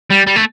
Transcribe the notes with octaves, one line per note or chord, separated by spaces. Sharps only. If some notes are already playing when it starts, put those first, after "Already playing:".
G3
G3
A3